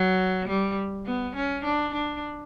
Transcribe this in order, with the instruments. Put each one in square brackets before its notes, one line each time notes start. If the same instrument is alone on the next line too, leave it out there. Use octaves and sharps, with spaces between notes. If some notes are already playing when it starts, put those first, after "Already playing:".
Already playing: [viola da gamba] F#3
G3
B3
C#4
D4
D4